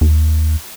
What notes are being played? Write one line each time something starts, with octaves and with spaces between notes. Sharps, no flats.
D#2